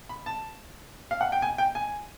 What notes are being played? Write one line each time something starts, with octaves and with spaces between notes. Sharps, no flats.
B5
A5
F5
F#5
G5
G#5
G5
G#5